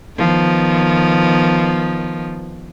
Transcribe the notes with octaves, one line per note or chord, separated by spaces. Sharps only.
D#3 F3 B3